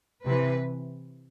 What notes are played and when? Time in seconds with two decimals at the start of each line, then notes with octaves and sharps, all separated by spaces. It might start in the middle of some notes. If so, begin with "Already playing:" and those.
0.25 C3 B4
0.30 E3